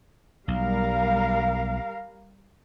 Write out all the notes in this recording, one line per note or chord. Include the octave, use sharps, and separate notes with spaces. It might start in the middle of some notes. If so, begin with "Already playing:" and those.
B1 G3 A#4 F5